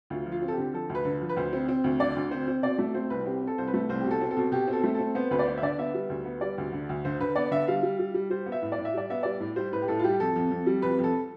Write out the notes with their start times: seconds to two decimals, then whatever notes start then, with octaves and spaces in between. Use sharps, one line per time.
0.10 D2 F4
0.26 F3
0.32 F4
0.42 C4
0.48 A4
0.53 G4
0.58 D3
0.74 F3 A4
0.89 D2
0.95 B4
1.05 D3
1.21 F3
1.29 B4
1.36 D2 C5
1.53 C4
1.69 C4
1.84 D2
2.00 D3 D5
2.16 D2
2.31 C4 C5
2.48 C4
2.63 B2 D5
2.78 A3
2.94 C4 C5
3.10 C2 B4
3.26 C4 G4
3.42 C4
3.47 A4
3.58 C2 C5
3.68 B4
3.74 A3
3.89 C2 C5
4.01 B2 G4
4.11 A4
4.21 C4
4.31 A4
4.37 B2
4.52 B2 G4
4.68 C4 A4
4.84 A3
4.95 C4 A4
5.15 B3 C5
5.31 D2 B4
5.39 D5
5.46 B3 C5
5.57 E5
5.63 D3 D5
5.78 B3 E5
5.94 G3
6.10 D2
6.25 B3
6.41 G3 D5
6.58 D2
6.72 D3
6.89 D2
7.05 D3 C5
7.20 D3 B4
7.36 B3 D5
7.51 D3 E5
7.67 G3 F5
7.83 G3
7.99 G3
8.14 G3
8.30 G3 C5
8.46 B3
8.52 E5
8.62 A2
8.72 D5
8.78 A2
8.85 E5
8.94 G3 D5
9.10 B3 E5
9.23 G3 D5
9.40 A2
9.56 G3 C5
9.72 A2 B4
9.82 G4
9.88 A2 A4
9.99 F4
10.04 G3 G4
10.20 F2 A4
10.36 F2
10.51 F2
10.67 G3
10.82 F2 B4
10.99 F2 A4